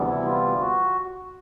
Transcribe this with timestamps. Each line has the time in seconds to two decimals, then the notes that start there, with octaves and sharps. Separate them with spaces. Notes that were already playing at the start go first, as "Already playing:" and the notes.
Already playing: D2 C3 E3 G3 B3
0.08 E4
0.25 F4
0.60 F#4